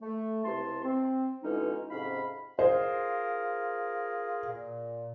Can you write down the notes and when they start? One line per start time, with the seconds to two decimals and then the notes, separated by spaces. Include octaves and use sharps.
0.01 A3
0.45 C#2 C3 E3 G4 A5 C6
0.84 C4
1.43 B2 D3 E3 G#3 C#4 D#4
1.90 F2 G#2 C3 C#4 F5 B5
2.59 F4 G#4 A#4 C5
4.49 A#2